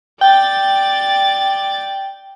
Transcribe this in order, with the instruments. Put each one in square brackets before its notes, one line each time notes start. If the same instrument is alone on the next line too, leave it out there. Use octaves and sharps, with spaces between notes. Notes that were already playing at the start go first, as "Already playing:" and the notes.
[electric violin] D5 A6 [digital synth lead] G5